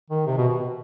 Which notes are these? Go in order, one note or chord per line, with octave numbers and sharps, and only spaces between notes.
D#3
C3
B2
B2